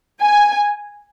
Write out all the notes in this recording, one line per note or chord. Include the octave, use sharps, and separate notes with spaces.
G#5